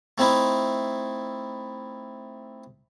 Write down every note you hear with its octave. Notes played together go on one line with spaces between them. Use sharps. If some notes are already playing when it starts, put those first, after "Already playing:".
A3 C4 D#4 E4